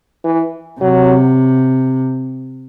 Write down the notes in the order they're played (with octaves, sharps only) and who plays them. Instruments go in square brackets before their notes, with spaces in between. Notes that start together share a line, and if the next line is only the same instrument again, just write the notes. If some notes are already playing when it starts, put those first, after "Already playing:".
[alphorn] E3
[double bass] C3 [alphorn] F#3